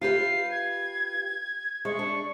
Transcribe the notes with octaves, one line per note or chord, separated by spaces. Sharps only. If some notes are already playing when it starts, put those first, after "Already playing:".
F4 G4 B4 C7
G#6
G#3 C#6
D4